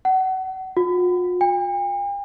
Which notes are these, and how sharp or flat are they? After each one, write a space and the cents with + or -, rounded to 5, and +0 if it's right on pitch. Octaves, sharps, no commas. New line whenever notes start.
F#5 +30
F4 +45
G5 +45